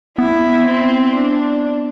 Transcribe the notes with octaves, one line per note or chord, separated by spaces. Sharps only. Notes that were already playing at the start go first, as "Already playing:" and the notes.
B3 E4
C4
D4